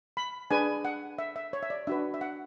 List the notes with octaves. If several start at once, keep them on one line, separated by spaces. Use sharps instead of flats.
B5
D4 G#4 B4 G#5
F#5
E5
E5
C#5
E5
D5
D4 F#4 B4 E5
E5
F#5